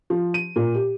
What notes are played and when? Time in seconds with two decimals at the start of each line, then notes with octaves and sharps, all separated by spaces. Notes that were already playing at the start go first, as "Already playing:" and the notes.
0.10 F3
0.34 D#7
0.56 A#2
0.74 G4